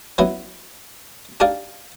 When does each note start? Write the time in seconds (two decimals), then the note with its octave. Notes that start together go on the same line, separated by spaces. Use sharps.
0.18 F#3 B3 C#4 E4
1.40 D4 D#4 G4 G#4 D5 F5